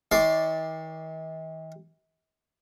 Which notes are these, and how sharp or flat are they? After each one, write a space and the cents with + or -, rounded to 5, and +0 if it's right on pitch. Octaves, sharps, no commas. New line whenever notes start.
D#3 +45 D5 +0 C6 +0